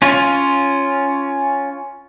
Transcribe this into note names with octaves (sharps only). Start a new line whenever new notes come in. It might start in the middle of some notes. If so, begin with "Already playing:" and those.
C#4 F4